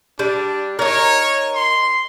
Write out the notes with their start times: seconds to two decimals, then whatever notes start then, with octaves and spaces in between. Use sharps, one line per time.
0.19 G3 D4
0.79 D#4 A#4 C#5
1.55 C6